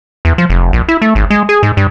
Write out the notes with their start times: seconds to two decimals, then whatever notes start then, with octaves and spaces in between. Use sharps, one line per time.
0.25 E2
0.38 F3
0.50 F1
0.73 A#1
0.88 E4
1.02 A3
1.15 G#1
1.30 G#3
1.49 G#4
1.63 G#2
1.77 G2